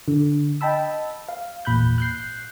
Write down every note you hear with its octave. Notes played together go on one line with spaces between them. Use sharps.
D3
D#5 G5 A5 B5 E6
F5
G#1 E2 A#2 B5 F#6 G6
F#6 G6 C7